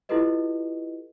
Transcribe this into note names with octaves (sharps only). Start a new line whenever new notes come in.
E4 F4 G4 A4 B4 D#5